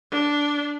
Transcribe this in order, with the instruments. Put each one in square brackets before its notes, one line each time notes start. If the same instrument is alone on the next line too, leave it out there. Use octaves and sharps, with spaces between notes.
[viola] D4